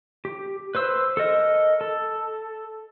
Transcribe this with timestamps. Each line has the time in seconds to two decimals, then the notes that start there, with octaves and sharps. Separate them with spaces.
0.25 G4
0.75 B4 C5 E6
1.17 A4 A#4 D#5
1.81 A4